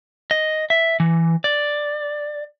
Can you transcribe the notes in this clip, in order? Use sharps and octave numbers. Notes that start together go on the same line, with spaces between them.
D#5
E5
E3
D5